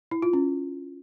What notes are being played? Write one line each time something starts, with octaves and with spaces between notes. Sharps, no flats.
E4
F4
C#4